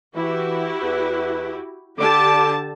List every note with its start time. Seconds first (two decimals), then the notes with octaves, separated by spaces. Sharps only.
0.16 E3 E4 F#4 G4
0.82 E2 B4
1.99 D3 G4 A5 D6